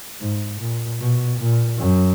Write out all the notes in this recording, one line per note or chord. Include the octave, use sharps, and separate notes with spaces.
G#2
A#2
B2
A#2
F#2